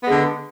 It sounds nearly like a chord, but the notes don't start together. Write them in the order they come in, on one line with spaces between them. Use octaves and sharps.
B3 G#3 D3